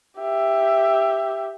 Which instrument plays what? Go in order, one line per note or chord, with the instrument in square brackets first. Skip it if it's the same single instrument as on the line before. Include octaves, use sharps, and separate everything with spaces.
[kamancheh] G4 E5